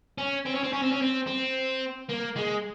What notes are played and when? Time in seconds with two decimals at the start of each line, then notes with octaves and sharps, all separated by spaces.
0.18 C#4
0.45 C4
0.54 C#4
0.63 C4
0.73 C#4
0.82 C4
0.92 C#4
1.01 C4
1.27 C4
2.10 A#3
2.37 G#3